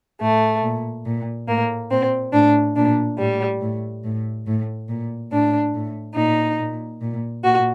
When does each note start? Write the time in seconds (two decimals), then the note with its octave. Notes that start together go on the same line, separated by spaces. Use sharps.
0.20 A2 A3
0.63 A#2
1.05 A#2
1.48 A2 A#3
1.91 A#2 C4
2.33 A2 D4
2.75 A#2 D4
3.18 A2 G3
3.61 A2
4.03 A2
4.46 A2
4.88 A#2
5.31 A2 D4
5.74 A2
6.16 A#2 D#4
6.59 A#2
7.01 A#2
7.44 A#2 F#4